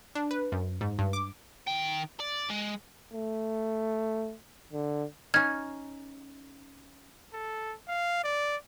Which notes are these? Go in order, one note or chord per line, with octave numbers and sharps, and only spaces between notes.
D4
B4
F#2
G#2
G2
D6
D#3 G5
D5
G#3
A3
D3
C#4 D#4 F6 G#6
A4
F5
D5